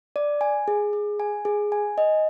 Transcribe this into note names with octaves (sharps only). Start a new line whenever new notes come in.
D5
G#5
G#4
G#4
G#5
G#4
G#5
D#5